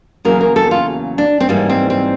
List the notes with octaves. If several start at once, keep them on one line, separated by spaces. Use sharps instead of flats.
E2 C#3 F#3 A#3 A#4
A#4
A4
F4
D4
C4
G#2 E3 G3 A#3 C#4
C4
C4